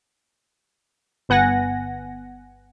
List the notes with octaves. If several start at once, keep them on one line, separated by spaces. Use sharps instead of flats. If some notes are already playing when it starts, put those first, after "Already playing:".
G1 B3 F#5 G#5 A#6